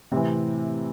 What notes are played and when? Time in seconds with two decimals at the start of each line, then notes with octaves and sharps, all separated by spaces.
0.12 A2 C3 E3 C4